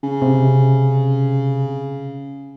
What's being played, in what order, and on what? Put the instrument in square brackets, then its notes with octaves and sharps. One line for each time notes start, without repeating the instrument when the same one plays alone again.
[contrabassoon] C#3
[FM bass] C3